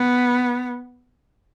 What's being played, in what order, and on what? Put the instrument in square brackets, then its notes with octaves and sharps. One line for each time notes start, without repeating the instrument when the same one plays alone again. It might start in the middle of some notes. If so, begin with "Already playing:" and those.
Already playing: [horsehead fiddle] B3